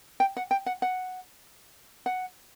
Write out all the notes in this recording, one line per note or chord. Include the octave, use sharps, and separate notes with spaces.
G5
F#5
G5
F#5
F#5
F#5